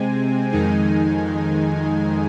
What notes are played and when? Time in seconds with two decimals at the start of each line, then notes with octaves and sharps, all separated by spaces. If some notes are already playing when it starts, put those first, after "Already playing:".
Already playing: C3 G#3 C4 G#5
0.52 F2 D#3 G#3 D#4 G#5